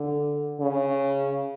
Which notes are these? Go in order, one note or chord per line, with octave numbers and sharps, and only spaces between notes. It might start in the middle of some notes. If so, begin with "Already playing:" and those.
Already playing: D3
C#3